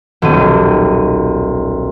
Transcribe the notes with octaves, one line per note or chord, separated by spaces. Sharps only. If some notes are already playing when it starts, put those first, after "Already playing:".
D#1 B1 D#7